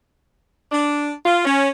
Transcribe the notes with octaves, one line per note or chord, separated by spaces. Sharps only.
D4
F4
C#4